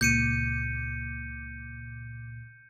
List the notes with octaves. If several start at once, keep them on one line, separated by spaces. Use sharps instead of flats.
C#2 A#2 D6 G6 C#7 D#7